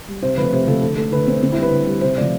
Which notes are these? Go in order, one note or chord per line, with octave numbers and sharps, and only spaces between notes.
G3
C3 C5
F3 A3 B4
C3 C5
F3 A3 A4
D3 A4
A3 A4
D3 B4
A3 C4
D3 C4
E4
G3 B4
D3
G3
C3 C5
F3 A3 D5